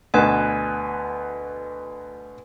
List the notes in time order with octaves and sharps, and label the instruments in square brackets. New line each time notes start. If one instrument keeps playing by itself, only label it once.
[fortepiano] D2 B2 [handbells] B4 G#5